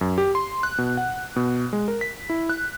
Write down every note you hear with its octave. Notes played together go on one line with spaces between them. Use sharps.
F#2
G4
C6
F#6
B2
F#5
B2
G#3
A#4
B6
E4
F#6